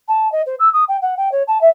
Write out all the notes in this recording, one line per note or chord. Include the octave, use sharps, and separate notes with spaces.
A5
D#5
C5
E6
D#6
G5
F#5
G5
C#5
A5
E5